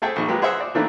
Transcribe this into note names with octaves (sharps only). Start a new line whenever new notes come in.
A3 G#4 A4 E5 G5
A#1 D#3 C#6
F#3 G#3 A#3 F4 G4 B4
G#4 C5 D#5 E5 F#5
D5
D#3 E3 A3 A#3 D4 E4